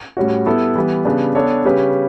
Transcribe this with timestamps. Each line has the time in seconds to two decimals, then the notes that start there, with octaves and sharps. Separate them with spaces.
0.17 A2 G3 C#4 F#4
0.46 G3 B3 E4 A4
0.75 E3 G3 B3
1.05 C#3 G3 B3 D4
1.35 B3 D4 A4 C#5
1.65 C#3 G3 C#4 G4 B4